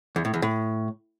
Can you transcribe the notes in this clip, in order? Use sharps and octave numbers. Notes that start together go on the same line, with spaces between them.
E2
A2
E2
A2